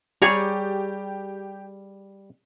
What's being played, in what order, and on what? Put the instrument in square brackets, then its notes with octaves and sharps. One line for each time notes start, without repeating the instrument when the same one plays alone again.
[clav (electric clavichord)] G3 [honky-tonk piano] G4 [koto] G#4 C#5 A#5